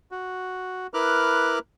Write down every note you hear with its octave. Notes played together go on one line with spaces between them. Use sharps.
F#4
E4 A#4 B4 D6 F6 F#6